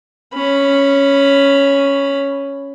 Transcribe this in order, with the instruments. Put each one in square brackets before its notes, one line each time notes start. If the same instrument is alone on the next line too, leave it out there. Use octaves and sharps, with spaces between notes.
[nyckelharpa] C#4 B5